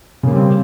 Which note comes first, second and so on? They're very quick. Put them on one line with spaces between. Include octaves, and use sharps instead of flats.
C#3 A#3 G3 C4